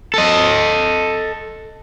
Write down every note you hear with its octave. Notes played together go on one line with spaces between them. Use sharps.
A4 D#5